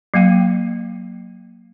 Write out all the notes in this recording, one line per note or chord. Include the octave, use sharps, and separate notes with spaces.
F#3 A#3 F5 G5